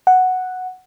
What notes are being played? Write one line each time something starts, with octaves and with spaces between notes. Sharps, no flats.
F#5